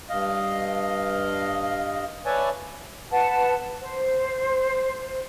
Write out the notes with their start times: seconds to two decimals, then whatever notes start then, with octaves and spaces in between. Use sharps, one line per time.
0.10 G2 D#5 F5
2.26 B4 C#5 D5 E5 G#5 A5
3.11 B4 F#5 A5
3.80 C5